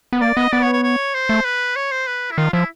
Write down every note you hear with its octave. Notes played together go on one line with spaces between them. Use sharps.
B3
A#3 D5
B3 D#5
B3 D5
C#5
C#5
C#5
C5
A3
B4
C#5
C5
B4
E4
D#3 F4
F3 E4